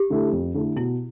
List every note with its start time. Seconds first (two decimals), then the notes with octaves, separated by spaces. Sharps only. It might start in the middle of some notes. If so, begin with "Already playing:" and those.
Already playing: G4
0.10 D3 A3 E4 A4
0.32 F2
0.54 D3 A3 E4 A4
0.76 B2 E4